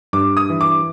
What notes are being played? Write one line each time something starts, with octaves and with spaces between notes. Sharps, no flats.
G2 D6
D#6
E3
D6